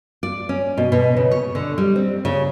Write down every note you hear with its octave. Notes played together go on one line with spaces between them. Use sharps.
D5
C#4
B2
B2
C#3
C#5
D3
G3
C4
C#3